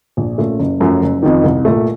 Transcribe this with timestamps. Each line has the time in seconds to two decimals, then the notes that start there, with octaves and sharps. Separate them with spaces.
0.17 A#1
0.38 A#2 A3 C#4 F4
0.59 F#1
0.80 F#2 F3 A3 C#4
1.02 F#1
1.23 F2 D#3
1.44 C2
1.65 A#2 A3